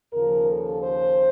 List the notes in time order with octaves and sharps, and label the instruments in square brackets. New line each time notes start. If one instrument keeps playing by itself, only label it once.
[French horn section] D#2 C#3 F3 A#4
A4
C5